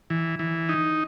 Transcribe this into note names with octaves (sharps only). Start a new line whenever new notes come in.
E3
E3
D#4